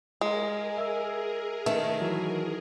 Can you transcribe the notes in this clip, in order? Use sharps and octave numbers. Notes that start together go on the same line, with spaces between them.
G#3 G#4 A#4
E5 G#5 E6
D#3 A3
E3 F#3